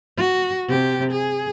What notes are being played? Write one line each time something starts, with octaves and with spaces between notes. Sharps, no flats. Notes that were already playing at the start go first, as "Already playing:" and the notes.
F#4
C3 G4
G#4